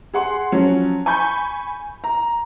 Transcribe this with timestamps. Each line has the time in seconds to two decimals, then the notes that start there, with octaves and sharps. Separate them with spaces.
0.14 G#4 F#5 C6
0.52 F3 F#3 C#4
1.06 G#5 B5 C#6 G6
2.04 A#5